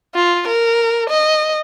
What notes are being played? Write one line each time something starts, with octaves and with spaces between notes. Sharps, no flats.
F4
A#4
D#5